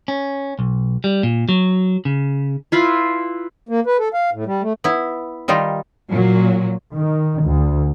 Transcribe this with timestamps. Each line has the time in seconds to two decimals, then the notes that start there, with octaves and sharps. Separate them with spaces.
0.08 C#4
0.59 B1
1.04 G3
1.23 A#2
1.49 F#3
2.05 C#3
2.72 E4 F4 B4
3.69 A#3
3.86 B4
3.99 A4
4.14 F5
4.33 A2
4.46 G3
4.62 A3
4.84 B3 E4
5.48 D#3 G3 D#4 F4
6.09 A#2 F#3
6.93 D#3
7.44 D2